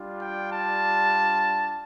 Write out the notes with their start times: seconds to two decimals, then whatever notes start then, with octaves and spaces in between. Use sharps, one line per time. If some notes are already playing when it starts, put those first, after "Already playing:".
Already playing: G3 D4 F4
0.20 G5
0.50 A5